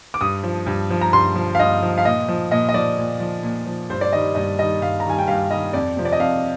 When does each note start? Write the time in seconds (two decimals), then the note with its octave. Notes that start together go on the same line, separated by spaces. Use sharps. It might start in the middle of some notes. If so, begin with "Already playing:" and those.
0.14 D6
0.21 G2 D#6
0.43 F3
0.66 G2
0.90 F3
1.01 A#5
1.13 G2 C6
1.36 F3
1.55 F5
1.59 G2 D#5
1.83 F3
1.98 F5
2.05 A#2 D#5
2.29 F3
2.51 A#2 D#5
2.69 D#5
2.74 F3 D5
2.98 A#2
3.20 F3
3.43 A#2
3.66 F3
3.90 G2 C5
4.01 D5
4.13 D#3 G3 D#5
4.35 G2 D#5
4.59 D#3 G3 D#5
4.81 G2 F5
5.00 A#5
5.05 D#3 G3 G#5
5.19 G5
5.28 G2 F5
5.50 D#3 G3 D#5
5.73 F2 D5
5.97 C3 F3
6.05 D5
6.13 D#5
6.19 F2 F5